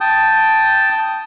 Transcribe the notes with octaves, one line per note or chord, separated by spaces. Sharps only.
G5 A5 D#6 G6